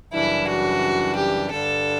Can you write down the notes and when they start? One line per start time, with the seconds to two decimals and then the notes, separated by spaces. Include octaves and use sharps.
0.13 F#2 C#3 E3 G3 D4 E4
0.48 F#4
1.16 G4
1.51 G2 D3 G3 D4 A4